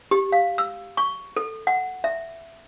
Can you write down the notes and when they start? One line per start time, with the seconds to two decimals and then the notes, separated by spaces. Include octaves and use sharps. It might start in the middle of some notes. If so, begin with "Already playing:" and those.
0.11 G4
0.32 F5
0.58 E6
0.97 C#6
1.36 A4
1.67 F#5
2.04 E5